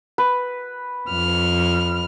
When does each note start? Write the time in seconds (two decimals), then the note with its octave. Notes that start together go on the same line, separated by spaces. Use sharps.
0.18 B4
1.08 F2 F6